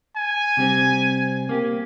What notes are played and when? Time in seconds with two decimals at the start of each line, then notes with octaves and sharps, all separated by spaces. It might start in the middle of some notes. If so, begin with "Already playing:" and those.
0.17 G#5
0.57 C3 G3 C4
1.49 A#3 G4